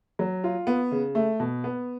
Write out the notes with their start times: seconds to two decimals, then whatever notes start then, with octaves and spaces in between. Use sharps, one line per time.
0.19 F#3
0.44 F4
0.67 B3
0.92 C#3
1.15 A3
1.40 B2
1.64 B3